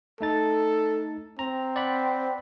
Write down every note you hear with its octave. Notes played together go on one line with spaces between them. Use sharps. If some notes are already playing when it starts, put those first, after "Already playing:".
A3 D#4 A4 A6
C4 A#5
D5 F#5 B5